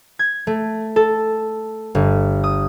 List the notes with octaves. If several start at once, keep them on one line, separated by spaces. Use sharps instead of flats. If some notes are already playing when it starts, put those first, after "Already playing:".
G#6
A3
A4
G1
D#6